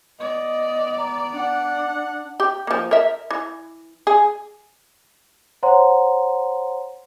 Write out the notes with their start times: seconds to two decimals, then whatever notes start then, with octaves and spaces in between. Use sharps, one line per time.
0.19 B3 D5 D#5
0.98 A#5
1.33 D4 F#5
2.40 G4
2.67 F3 A#3
2.91 A#4 E5
3.31 E3
4.07 G#4
5.63 C5 C#5 F#5 A#5 C6